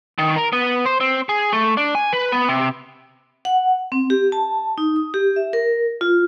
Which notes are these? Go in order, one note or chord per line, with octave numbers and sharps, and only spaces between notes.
D#3
A#4
B3
C5
C4
G#4
A3
D4
G#5
B4
B3
C3
F#5
C4
G4
A5
D#4
D#6
G4
E5
A#4
F4